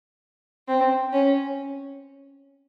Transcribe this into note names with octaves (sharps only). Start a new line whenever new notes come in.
C4
C#4